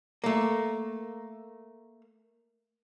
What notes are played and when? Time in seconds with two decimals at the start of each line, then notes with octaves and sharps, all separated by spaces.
0.24 A3 A#3